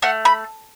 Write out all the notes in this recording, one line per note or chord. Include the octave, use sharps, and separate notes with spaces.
A3 F#5
B5